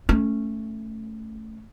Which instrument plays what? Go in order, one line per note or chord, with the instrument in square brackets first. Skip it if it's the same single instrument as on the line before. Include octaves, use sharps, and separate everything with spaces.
[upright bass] A3 C#4